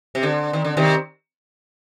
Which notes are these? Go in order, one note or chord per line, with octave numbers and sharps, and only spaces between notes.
C3
D3
D#3
D3
C3 D#3